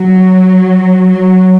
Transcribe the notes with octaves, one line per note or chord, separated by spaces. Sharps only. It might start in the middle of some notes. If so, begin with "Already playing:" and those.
Already playing: F#3
F#3